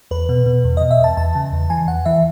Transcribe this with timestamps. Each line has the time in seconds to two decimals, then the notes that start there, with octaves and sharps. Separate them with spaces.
0.11 E2 B4
0.29 B2
0.46 B2
0.64 E2
0.77 B2 D#5
0.91 E5
0.99 E2 A5
1.17 E2 A5
1.35 C#3
1.53 E2
1.70 E3 G#5
1.88 E2 F#5
2.05 E3 E5